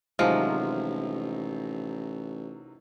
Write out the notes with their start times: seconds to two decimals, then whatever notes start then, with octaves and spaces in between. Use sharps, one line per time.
0.19 A1 C3 D#3 F3 F#3 G#3